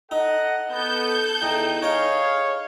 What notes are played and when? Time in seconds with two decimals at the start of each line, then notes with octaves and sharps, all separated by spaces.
0.11 D#4 A4 D#5 F#5
0.71 B3 A4 G6
1.42 E2 D#4 G5
1.83 D#4 G#4 C#5 F5 G5